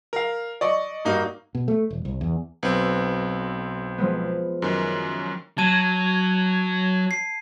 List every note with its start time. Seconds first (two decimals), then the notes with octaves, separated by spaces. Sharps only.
0.13 A#4 F5
0.61 D5 D#5 C#6
1.05 G2 A#3 D#4 F#4
1.55 B2
1.68 A3
1.90 E1
2.05 C2
2.21 E2
2.63 B1 C4 B4
3.98 F3 G#3 B3
4.62 F#2 D#3
5.58 F#3 A5 G#6 D#7
7.11 C7